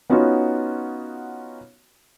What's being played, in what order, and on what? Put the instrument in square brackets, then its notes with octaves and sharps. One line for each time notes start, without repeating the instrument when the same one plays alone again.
[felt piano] B3 C#4 D#4 F4 F#4